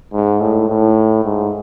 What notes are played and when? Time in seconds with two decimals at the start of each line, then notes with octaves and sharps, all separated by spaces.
0.13 G#2
0.41 A2
0.69 A2
1.25 G#2